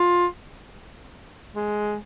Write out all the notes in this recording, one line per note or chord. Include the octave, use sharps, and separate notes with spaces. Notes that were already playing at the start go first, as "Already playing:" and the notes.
Already playing: F4
G#3